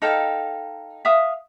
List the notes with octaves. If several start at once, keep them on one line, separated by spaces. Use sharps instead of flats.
D#4 A4 F5 G5
E5 F5 D#6